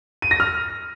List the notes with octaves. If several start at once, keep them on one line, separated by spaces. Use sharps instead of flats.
D#7
A#6
F6